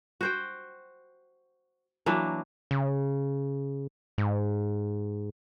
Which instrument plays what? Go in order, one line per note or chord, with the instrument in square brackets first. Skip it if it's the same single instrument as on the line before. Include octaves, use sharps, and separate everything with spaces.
[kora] F#4 C5 G5
E3 F#3 A#3 D4
[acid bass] C#3
G#2